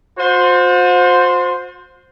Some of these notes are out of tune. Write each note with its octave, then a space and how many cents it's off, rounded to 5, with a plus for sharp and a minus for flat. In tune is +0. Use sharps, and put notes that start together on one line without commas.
F#4 -45 C5 +0